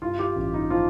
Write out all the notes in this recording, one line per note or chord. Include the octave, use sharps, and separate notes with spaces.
G2 F4
G4
A1
D#4
F3 F4